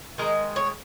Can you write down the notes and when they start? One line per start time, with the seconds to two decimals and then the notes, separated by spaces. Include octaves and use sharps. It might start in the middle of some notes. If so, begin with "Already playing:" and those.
0.18 D#3 G#3 A#4
0.56 C#5